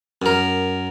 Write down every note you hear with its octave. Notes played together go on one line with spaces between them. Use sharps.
F#2 A#4